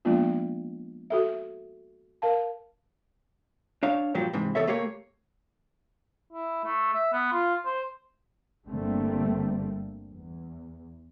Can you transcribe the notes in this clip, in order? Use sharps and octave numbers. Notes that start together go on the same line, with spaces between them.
F3 G#3 A#3 B3 D4 F4
F#4 A4 E5
A#4 F5 A5
D4 C#5 F5
G2 A#2 F3 F#3 G4
G#2 C3 E3
E2 A4 C#5 E5
A3 A#3 G4 C#5
E4
A3
E5
B3
F4
C5
G1 D3 G3 A3 A#3 C4
E2